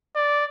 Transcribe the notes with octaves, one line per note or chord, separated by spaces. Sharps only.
D5